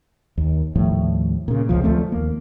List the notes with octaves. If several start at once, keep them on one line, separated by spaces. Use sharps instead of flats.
D#2
D#2 A2 F3 G3
A#2 C#3
F1 C#2 F3
D2 F3 A3 C4
D#2 A#3